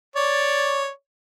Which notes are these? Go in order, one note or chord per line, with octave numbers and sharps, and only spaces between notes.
C#5 D5